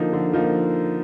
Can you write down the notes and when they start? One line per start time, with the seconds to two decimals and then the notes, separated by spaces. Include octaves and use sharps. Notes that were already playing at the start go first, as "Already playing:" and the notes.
Already playing: D3 F3 A#3 D#4
0.13 D3
0.33 F3 A#3 D#4